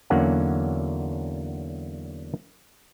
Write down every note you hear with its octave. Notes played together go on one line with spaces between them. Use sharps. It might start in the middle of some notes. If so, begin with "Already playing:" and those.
E2 D3 F#3 A#3 C#4 F#5